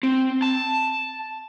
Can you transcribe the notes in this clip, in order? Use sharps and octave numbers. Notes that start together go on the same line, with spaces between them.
C4
A5